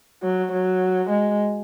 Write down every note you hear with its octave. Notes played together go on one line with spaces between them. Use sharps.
F#3
F#3
G#3